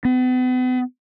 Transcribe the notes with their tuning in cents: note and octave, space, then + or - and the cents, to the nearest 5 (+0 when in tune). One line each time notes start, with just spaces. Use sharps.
B3 +40